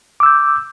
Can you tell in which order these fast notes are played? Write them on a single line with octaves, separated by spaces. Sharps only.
D6 E6 G6